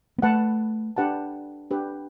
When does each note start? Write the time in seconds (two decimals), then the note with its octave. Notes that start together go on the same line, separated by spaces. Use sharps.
0.18 B3
0.22 A3 B4 F#5 A5
0.96 D4 G4 B4 F#5 A5
1.71 D4 G4 B4